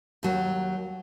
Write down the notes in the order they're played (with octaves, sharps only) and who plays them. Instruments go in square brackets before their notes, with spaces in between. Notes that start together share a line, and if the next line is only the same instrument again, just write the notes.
[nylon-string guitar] D#2 F#3